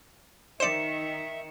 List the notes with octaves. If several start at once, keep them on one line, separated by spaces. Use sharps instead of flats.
D#3 C5 D5 E5 C#7 E7